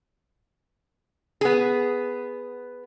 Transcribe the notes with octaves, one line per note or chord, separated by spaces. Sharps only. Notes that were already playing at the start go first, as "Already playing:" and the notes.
B3 G#4